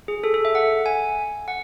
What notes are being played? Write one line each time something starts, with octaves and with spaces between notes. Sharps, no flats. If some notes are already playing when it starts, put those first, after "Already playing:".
G#4
A4
A4
E5
F#5
G#5
F#5